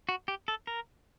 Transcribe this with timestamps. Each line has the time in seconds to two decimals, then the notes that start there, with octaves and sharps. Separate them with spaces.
0.09 F#4
0.28 G4
0.48 A4
0.67 A#4